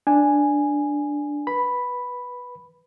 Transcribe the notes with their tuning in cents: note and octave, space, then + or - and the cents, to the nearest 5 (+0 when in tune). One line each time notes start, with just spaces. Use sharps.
D4 +0 G#5 +0
B4 -10 B5 +0